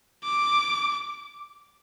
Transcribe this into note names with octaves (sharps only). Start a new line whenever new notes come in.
D6